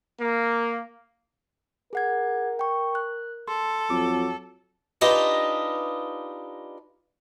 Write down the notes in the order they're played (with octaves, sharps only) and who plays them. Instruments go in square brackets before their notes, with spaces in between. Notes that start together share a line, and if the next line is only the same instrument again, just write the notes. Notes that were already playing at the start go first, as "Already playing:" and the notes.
[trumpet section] A#3
[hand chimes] G#4 F#5 G#6 [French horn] A#4
[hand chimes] G5 C#6
F#6
[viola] A4 [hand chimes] C6
[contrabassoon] F2 [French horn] F#3 [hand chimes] D6
[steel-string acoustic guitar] D4 D#4 F4 G4 B4 D#5